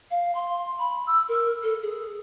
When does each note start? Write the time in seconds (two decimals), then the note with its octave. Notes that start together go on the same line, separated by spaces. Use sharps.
0.11 F5
0.35 C6
0.79 B5
1.07 E6
1.29 A#4
1.63 A4
1.82 G#4